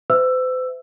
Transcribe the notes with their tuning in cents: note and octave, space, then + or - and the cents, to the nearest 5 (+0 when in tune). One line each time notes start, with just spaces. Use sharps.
C5 -45 E5 +0 E6 +15